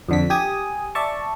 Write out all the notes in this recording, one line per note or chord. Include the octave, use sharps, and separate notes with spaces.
F2 D3 B6
G4 G#5 D#6
D5 E5 A5 C#6